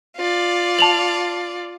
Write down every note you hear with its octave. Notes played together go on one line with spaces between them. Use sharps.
F4 D5
A5 F7 F#7